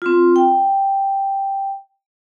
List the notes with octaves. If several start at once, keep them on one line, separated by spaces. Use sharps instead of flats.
C4 F4
G5